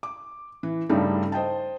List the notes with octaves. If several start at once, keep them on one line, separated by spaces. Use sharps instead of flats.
D6
E3
G2 C#3 G3 A3 D#4
C5 D#5 G5 A5